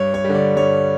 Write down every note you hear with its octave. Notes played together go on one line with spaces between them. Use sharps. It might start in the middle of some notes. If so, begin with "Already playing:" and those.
Already playing: G2 C#5
C#5
D3 G3
D5
G2 C#5